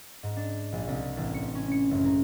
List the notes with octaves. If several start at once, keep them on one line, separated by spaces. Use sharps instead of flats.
G#2
D4
A#1
C2
A1
C#7
C#4
C#7
F#1
A#4